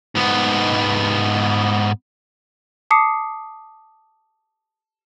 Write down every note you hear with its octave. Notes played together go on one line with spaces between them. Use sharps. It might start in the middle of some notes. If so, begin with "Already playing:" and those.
G#2 B3
A5 D6 D#6 C7 C#7